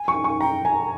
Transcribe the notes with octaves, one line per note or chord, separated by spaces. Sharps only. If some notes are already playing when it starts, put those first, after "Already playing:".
Already playing: G#5
C#6
C#6
G5 A#5
G#5 A#5